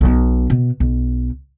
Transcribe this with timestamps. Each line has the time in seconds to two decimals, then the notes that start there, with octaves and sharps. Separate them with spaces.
0.01 B1 B3
0.50 B2
0.80 B1